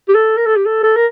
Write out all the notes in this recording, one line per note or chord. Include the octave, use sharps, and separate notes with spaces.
G4
A4
A#4
A4
G4
A4
A4
A#4